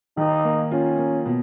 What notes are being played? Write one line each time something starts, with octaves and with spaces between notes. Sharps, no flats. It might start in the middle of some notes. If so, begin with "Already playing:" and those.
D#3 D#4
A#3
C#4 F4
A#3
B2